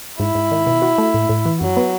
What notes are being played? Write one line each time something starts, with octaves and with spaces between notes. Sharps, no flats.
G#2 E4
G#2
D#3
B2
F#4
A3
A2
A2
E3
F#2 F#3
B3